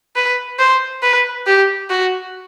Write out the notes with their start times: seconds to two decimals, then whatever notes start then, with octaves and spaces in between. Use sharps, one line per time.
0.16 B4
0.59 C5
1.03 B4
1.47 G4
1.90 F#4